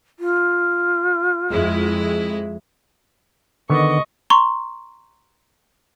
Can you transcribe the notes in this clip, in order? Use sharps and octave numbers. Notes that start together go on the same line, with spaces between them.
F4
F2 G#3 E4
D3 D#3 B3 D#5 C#6
A#5 C6 C#6